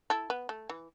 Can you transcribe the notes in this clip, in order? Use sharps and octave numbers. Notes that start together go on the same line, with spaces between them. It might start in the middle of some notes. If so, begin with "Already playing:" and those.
E4 A4
B3
A3
E3